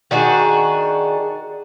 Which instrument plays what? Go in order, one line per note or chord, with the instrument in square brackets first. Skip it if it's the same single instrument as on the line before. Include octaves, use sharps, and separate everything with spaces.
[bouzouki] D#3 D4 F#4 G#4